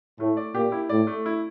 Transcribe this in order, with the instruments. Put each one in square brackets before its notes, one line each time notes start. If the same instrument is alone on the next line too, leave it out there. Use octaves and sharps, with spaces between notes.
[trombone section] A2 [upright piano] A3
[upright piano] D5
[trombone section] A#2 [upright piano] G4
[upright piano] E4
[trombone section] A2 [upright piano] D5
[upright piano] A3
E4